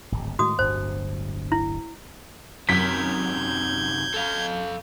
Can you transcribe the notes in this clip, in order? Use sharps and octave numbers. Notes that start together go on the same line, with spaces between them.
D1 G#1
A2 D#3 G#3 F#4 D#6
D1 G1 G2 C5
E4
F#2 C3 D#3 G6 G#6 B6
A4 F5